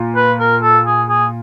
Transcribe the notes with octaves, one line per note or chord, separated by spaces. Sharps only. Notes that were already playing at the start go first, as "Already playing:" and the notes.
Already playing: A#2
B4
A#4
A4
G#4
G#4